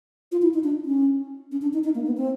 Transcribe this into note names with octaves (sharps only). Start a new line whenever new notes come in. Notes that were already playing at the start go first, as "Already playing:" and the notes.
F4
E4
D#4
D4
C#4
C#4
D4
D#4
D#4
A#3
B3
C4